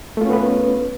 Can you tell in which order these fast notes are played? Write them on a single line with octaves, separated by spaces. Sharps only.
A3 F4 C#4 B3 B4